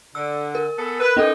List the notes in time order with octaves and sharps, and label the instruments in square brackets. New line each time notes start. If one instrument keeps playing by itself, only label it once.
[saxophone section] D3 [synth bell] E6
[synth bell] A#4
[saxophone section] B3 G#4 A4
B4
[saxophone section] D#3 E3 D#4 [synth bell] C#4 A4